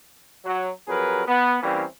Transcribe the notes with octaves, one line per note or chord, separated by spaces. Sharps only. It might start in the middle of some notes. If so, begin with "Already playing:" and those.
F#3
F2 F#3 G#4 A#4 B4
B3
E3 G3 A#3 C4 C#4